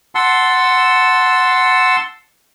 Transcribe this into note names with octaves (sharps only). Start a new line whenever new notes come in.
F#5 A5 C6 E6